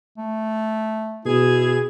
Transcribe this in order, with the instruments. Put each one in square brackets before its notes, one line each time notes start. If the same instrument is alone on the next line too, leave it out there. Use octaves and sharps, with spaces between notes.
[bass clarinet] A3
[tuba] B2 [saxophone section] E4 G#4